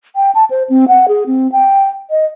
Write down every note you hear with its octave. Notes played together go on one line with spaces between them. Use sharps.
G5
A5
C5
C4
F#5
G#4
C4
G5
D#5